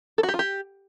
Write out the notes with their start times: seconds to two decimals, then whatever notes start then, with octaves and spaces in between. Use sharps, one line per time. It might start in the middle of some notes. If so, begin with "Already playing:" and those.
0.18 A4
0.23 F#4
0.29 G4
0.34 F4
0.39 G4